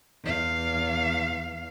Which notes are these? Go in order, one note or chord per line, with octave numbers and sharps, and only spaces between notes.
E2 F5